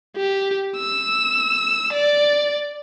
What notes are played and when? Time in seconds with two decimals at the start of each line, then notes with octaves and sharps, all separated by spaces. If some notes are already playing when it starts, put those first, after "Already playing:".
0.17 G4
0.77 E6
1.93 D5